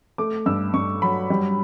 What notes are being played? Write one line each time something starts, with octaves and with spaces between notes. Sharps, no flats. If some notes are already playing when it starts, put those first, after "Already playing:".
A3 D6
G2 E6
G2 C#6
F#3 B5
G3